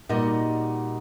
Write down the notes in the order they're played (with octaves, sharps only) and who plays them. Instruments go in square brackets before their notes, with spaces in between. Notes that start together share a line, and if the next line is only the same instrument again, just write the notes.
[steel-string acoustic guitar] A#2 G3 D#4 F#4 D#5